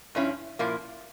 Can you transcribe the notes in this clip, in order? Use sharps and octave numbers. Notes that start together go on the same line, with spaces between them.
G2 F3 C#4 E4
A#2 F3 A#3 E4